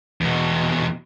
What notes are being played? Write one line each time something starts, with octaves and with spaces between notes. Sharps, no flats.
E2 B2